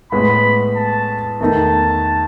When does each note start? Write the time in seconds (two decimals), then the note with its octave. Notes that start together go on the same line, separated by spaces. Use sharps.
0.12 A2 G#3 B3 B5
0.76 A5
1.40 E2 D#3 A3 D#4 A5